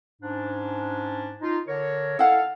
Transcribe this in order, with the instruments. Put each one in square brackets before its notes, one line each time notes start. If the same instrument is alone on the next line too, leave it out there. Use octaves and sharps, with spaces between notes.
[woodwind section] G#2 C#4 D4
D#4 F4
D3 A#4 C#5
[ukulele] E4 F#5 [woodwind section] A4 F5